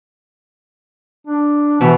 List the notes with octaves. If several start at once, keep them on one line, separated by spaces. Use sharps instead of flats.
D4
B2 E3